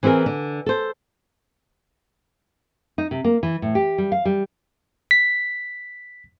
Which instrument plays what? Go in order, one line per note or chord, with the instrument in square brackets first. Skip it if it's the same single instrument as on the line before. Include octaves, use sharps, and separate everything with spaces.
[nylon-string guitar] E3 C4 E4 G#4 A#4
D3
A4 C5
D#4
C3
A#3
E3
A2
G4
G3
F5
G3
[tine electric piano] B6